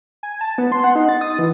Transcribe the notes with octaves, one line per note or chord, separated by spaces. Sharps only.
G#5
A5
B3
C6
F#5
D#4
A6
D#6
E3